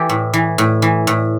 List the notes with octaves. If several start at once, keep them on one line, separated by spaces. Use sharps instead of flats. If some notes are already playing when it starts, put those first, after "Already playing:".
Already playing: E3 G4 A4
A2
E3
A2
E3
A2